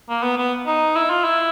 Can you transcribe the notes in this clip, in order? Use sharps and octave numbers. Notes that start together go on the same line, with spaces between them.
A#3
B3
B3
D#4
E4
F4
E4